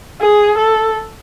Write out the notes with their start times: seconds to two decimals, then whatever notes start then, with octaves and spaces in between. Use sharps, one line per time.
0.21 G#4
0.58 A4